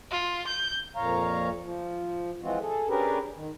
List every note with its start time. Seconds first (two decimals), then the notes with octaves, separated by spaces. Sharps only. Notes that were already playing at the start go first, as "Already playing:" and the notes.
0.11 F4
0.47 G6
0.96 F2 A#2 C#5 F5 A#5
1.62 F3
2.43 E3 F3 G#3 C4 F4 F#4
2.60 G#4 A4
2.89 C#4 D4 G4 G#4 A#4 B4
3.35 D#3